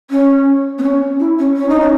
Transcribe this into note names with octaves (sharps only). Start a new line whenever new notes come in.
C#4
B3
C#4
E4
C#4
C#4
D#4
C#4